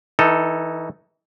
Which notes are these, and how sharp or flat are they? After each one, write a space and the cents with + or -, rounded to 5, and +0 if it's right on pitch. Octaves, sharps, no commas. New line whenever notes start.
E3 -25 D#4 +0 A4 +5